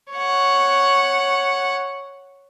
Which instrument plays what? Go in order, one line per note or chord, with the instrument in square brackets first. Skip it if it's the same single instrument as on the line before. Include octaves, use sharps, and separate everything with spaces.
[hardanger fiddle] C#5 F#5